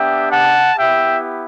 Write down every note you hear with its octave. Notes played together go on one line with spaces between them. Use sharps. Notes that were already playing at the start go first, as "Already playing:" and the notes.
Already playing: B3 D4 G4 E5 G5
F#5 A5
B3 E4 G4 E5 G5